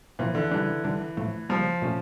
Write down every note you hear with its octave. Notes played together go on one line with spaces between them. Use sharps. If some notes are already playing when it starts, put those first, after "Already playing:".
A#2 E3 F3 A#3
D3
C#3 E3 G3 D4
D3 G3 D4
A2 F3 A3
C#3 F3 G3 A#3
A#2 A3 C#4